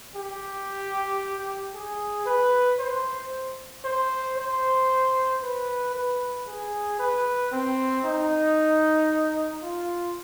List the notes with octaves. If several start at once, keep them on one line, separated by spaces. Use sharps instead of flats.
G4
G#4
B4
C5
C5
C5
B4
B4
G#4
B4
C4
D#4
F4